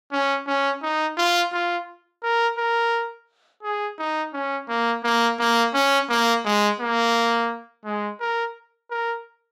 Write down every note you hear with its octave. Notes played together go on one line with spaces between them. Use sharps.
C#4
C#4
D#4
F4
F4
A#4
A#4
G#4
D#4
C#4
A#3
A#3
A#3
C#4
A#3
G#3
A#3
G#3
A#4
A#4